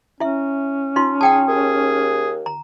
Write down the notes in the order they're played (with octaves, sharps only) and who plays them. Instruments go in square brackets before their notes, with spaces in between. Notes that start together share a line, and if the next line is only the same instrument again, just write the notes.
[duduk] C#4 [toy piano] E4 E5
[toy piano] D#4 F4 C6
[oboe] G#4 [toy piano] F#5 G5 A5
[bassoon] D#2 [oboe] G#4
[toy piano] A#5